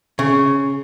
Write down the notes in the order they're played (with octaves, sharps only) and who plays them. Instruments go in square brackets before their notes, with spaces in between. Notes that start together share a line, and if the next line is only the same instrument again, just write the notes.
[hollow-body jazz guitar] C#3